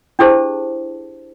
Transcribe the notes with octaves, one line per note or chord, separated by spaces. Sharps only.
D4 E4 G4 G#4 C5 A5